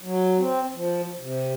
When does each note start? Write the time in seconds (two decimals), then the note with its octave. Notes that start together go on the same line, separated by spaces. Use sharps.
0.02 F#3
0.38 C4
0.74 F3
1.18 C3